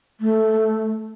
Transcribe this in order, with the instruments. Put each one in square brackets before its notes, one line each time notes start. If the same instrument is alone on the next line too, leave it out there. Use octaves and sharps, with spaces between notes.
[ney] A3